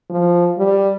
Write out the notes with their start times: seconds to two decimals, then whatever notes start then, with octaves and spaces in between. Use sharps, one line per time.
0.10 F3
0.59 G3